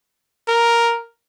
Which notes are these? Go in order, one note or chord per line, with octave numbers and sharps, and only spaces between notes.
A#4